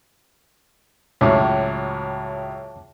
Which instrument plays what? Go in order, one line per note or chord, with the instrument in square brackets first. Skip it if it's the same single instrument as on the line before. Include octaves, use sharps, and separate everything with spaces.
[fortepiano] C#2 A2 F#3 [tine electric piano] C#5 A5 D6